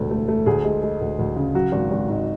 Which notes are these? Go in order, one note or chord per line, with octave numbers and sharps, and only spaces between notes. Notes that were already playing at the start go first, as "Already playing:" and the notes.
Already playing: E1 D2 A3
A3
A3
D2 G#4
G#3
G#3
D2
D2
C#3
F#3 F#4
G#1
G#1
G#2